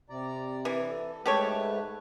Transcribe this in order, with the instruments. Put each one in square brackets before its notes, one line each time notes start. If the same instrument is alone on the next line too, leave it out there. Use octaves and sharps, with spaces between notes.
[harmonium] C3 D5 A#5
[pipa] E3
[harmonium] A4
[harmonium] G#2 A3 B4 [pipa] G4 A4 C#5